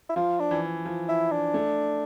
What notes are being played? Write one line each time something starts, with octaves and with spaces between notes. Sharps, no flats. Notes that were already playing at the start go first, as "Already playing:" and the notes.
E4
F3 F4
D4
E3
F3
E4
D4
A3